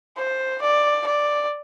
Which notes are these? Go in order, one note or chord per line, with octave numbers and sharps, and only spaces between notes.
C5
D5
D5